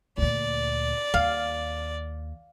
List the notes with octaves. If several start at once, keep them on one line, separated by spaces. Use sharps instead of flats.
D2 A#2 D5
D#2 F5